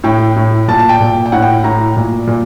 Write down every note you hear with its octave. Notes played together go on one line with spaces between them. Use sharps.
A2 G5
A2
A#2 A5
A5
G5
A#2
G5
A2 F#5
G5
A2 A#5
A#2
A#2